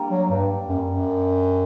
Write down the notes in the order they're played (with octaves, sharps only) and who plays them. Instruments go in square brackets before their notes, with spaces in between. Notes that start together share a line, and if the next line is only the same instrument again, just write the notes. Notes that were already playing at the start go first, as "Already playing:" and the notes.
Already playing: [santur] G3 A#3 D4
[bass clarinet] F#3
G2
F#2
F#2